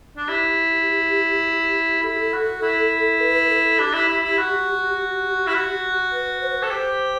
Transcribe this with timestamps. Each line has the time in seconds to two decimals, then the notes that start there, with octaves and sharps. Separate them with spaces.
0.17 D4
0.28 E4 G4
2.03 E4 A4
2.33 F#4
2.62 E4
3.20 B4
3.49 A4
3.79 D4 G4
3.93 E4
4.08 E4
4.23 E4
4.38 F#4
5.47 E4
5.54 F#4
6.12 B4
6.41 C5
6.50 B4
6.58 C5
6.63 A4
6.71 G4 C5